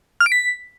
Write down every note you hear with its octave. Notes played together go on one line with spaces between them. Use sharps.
F6
D7
B6